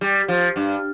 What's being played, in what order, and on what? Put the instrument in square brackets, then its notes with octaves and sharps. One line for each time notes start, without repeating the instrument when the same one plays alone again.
[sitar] G3
F3
G2